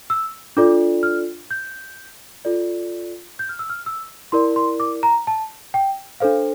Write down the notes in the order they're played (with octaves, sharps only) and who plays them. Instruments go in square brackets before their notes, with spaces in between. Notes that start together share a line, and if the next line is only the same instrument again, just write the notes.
[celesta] E6
D4 F4 A4 D5 D6
F6
G6
F4 A4 D5
G6
F6
E6
F6
E6
E4 A#4 D5 C6
C6
D6
A#5
A5
G5
D4 A4 C5 F5